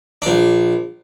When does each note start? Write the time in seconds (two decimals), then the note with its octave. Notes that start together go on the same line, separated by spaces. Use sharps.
0.22 A#1 D4